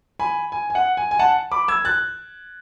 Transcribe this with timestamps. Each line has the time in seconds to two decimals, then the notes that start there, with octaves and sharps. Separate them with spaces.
0.19 G#5 B5
0.52 G#5
0.70 G#5
0.75 F#5
0.97 G#5
1.11 G#5
1.19 F#5 A5
1.52 B5 D6
1.68 E6 G#6
1.85 F#6 A6